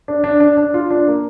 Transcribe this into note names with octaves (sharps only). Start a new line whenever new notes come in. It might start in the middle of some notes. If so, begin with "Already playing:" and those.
D4
D4
D4
D4
F4
D4
A#3